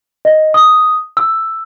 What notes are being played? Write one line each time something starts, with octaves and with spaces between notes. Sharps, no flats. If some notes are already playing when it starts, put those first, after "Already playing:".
D#5
D#6
E6